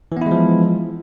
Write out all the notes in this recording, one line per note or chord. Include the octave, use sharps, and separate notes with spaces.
E3 F3 G#3 B3 E4